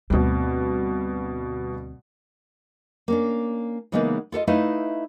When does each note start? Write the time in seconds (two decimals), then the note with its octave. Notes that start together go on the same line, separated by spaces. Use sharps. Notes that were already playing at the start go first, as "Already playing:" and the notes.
0.10 D2 G2 B2 C4
3.08 A#3 C#4 D4
3.92 C#3 E3 G#3 A#3 B3 D#4
4.32 F4 A4 B4 D#5
4.47 A3 D#4 E4 B4 D#5 F5